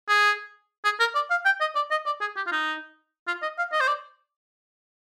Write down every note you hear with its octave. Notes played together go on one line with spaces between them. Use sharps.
G#4
G#4
A#4
D5
F5
G5
D#5
D5
D#5
D5
G#4
G4
F4
D#4
F4
D#5
F5
D#5
C5
D5